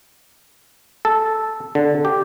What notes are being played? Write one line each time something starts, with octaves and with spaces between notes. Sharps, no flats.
A4
D3
G4